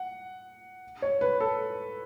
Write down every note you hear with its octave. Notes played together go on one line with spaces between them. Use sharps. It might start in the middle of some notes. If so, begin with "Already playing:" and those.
Already playing: F#5
C#5
B4
A4